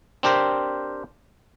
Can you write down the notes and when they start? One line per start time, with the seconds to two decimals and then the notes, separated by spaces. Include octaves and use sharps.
0.23 C4 D4 G4 A#4 C5